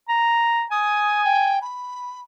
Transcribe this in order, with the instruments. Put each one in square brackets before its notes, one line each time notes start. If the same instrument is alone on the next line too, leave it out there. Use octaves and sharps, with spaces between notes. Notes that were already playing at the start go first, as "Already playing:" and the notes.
[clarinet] A#5
[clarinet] G#5 [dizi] D#6
[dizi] G5
B5